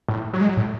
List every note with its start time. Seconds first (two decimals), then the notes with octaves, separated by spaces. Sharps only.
0.08 A2
0.34 F#3
0.41 G#3
0.49 F#3
0.57 A2